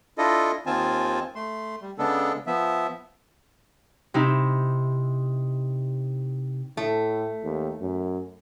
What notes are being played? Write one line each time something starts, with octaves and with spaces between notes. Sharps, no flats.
D4 E4 F4 A4 D#5
D#2 D#3 C4 F4 G#5 A5
A3 C6
G3
C#3 G#3 B3 D4 A4
F3 B3 E5
C3 D#4 E4
A2 A3
D#2
F#2